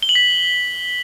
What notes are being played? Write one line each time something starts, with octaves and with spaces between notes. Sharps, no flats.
G7
F#7
B6